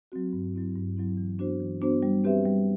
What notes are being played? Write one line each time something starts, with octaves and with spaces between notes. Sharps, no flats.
F#3 C4 F#4
G2
F#3 C4 E4
G2
F#3 C4 E4
E3
B3 D4 F#4 C5
E3
B3 D4 F#4 C5
G3
C4 G4 B4 E5
G3